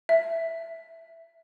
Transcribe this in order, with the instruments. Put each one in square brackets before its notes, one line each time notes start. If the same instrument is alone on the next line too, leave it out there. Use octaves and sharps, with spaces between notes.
[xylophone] E5